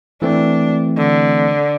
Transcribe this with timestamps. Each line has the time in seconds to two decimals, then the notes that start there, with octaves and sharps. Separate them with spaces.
0.22 E3 A3 C4 D4
0.97 D3